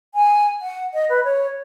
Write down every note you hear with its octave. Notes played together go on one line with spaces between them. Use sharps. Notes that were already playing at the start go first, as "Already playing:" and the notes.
G#5
F#5
D#5
B4
C#5